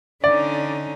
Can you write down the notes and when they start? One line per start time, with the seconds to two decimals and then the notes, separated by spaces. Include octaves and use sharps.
0.24 D3 C#4 D#4 D5